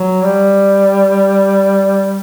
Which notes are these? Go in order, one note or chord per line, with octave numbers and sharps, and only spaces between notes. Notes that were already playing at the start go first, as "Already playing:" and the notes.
Already playing: F#3
G3